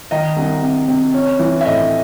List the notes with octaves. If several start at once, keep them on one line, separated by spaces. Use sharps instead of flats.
D#3 D#5
C2
C3
C3
C#4
E3
E5
A2 D#5